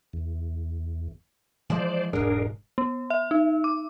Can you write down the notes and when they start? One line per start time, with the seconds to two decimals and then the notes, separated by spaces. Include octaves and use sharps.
0.13 E2
1.70 E3 F3 G#3 C5 D5
2.13 E1 G#2 D4 G#4 A#4
2.78 B3
3.10 E5
3.31 D#4
3.64 D6